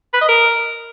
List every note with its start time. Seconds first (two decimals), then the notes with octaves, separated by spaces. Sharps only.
0.14 B4
0.21 D#5
0.29 A#4